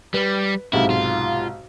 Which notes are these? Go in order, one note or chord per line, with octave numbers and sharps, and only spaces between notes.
G3 B4
B1 G#2 C3 E4
F4